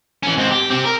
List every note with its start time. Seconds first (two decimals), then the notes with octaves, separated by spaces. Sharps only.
0.23 E3 C#4
0.37 G#2 C4
0.51 G4
0.70 C4 G4
0.85 A#4